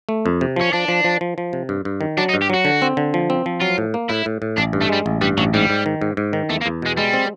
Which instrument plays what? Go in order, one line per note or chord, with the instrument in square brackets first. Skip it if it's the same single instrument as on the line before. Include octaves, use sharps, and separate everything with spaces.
[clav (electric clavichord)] A3
F2
C3
[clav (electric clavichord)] F3 [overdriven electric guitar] C#4
[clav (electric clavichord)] F3 [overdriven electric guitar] D4
[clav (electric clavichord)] F3
F3
F3
F3
C3
G2
G2
D#3
[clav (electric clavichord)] F#3 [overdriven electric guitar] D4
[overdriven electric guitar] D#4
[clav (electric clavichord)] G2
[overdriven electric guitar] G4
[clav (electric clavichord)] F#3 [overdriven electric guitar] F#4
[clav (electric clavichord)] D3
C4
D3
F3
C4
F3
[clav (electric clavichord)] F#3 [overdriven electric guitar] F4
[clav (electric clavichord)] A2
A#3
[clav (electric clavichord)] A2 [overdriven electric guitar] E4
[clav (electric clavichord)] A2
A2
[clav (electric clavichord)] A1 [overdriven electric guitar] D4
[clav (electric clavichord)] G2
[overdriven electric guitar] A3
[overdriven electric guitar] G3 [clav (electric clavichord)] G#3
[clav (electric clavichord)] A1
[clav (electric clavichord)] G2 [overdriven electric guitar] G3
[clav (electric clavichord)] A1 [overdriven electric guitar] F#3
[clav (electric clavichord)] G#2 [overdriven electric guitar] G3
[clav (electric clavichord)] G#2
D#3
G#2
G#2
D#3
[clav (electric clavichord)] E2 [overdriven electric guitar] A3
[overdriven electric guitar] A#3
[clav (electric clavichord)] E2
[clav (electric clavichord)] B2 [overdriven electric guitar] G#3
[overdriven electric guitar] G3 [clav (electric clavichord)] G#3
[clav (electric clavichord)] C4